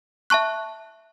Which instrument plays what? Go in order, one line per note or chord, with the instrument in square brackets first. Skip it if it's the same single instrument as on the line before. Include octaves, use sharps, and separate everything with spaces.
[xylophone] E5 A5 C#6 F#6